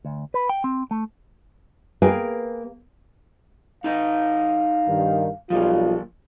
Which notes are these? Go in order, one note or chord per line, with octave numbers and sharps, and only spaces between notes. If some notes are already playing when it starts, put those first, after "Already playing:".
D2
B4
G5
C4
A3
A#3 G#4 B4 F5 G5 G#5
D#4 A4 D#5 F5
G2 D#3
B1 F3 G3 A#3 F4